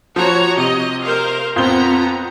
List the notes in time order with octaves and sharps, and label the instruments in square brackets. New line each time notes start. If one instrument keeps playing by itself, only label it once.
[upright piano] F3 [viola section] F#4 C#5 A#5
[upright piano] C3 [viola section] D#5
[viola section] A#4 C5 F5
[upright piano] F2 G6 G7 [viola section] B3 A#5 [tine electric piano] C4 F4